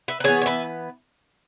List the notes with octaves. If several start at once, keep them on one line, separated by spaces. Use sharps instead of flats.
B4 E5
B4
E3 B3 G#4 C#5
C#5
B4 E5